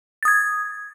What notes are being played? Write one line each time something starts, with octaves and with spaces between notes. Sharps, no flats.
D#6 G#6 A6